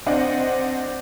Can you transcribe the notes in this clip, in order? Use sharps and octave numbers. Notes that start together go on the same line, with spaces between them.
C4 D4 D#5 F#5